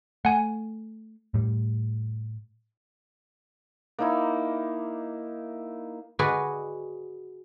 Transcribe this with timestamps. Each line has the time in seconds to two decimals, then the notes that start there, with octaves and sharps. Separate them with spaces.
0.25 A3 F#5 G#5
1.34 A2 G3
3.99 A#3 D#4 E4
6.19 F#4 G#4 B4 D5 D#5